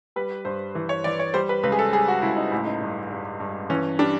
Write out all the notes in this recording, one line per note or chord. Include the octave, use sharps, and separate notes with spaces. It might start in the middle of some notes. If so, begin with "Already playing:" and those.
G3 B4
G2 C5
E3
C#5
E3 D5
C#5
G3 C5
B4
C#2 B4
G#4
A4
G3 G#4
F#4
C#2 E4
D#4
A1 E4
D#4
G2
G2
G2
E3 C#4
G3 D4